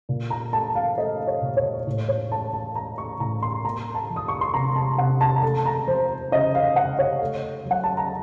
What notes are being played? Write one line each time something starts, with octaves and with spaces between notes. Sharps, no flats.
A#2
A#5
A3 A5
F5
A3 D#5
C#5
A#2
C#5
A2
C#5
A3 A5
A5
A3 A#5
C#6
A2 A#5
C6
A#3 A#5
A5
F3
D#6
C#6
C6
C3 A#5
A5
C3 F#5
A5
A#5
A3 A5
A#5
F3 C5
C#3 D#5
F5
C#3 F#5
C#5
A3
F#3
F#5
A5
A#5